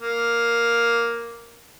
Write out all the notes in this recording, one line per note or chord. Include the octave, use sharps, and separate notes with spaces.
A#3